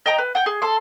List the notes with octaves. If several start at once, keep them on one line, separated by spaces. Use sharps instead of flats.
D#5 G5 A#5
B4
F#5 G5
G#4
A4 C6